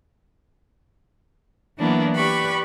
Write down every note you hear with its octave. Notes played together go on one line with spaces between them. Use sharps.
E3 F#3 A#3 B3 D4 E4
G4 B4 D5 B5 C#6